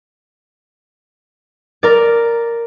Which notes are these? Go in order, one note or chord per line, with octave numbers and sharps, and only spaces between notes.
A#4 D5